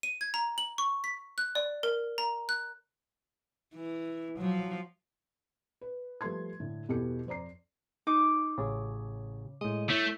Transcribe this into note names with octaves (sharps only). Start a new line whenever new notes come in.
D#7
G#6
A#5
F#7
C#6
B6
F#6
D5
A#4
A#5
F#6
E3
F3 F#3
B4
F3 G3 A3 B4 C6 G#6
A2 D3
E2 B2 G4 A4 C#7
F2 C5 D5 A#5 C7
D#4 D6
A1 C#3 G#4 C#5
A2 G#3 D#5
A3 E4 C#5